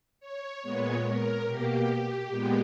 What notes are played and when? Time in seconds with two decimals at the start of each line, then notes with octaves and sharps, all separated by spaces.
0.20 C#5
0.62 A#2 G#3 B3 C#5
1.03 A#4
1.45 B2 A#3 G4
2.28 A#2 G#3 B3